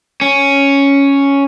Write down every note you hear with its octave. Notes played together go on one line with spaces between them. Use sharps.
C#4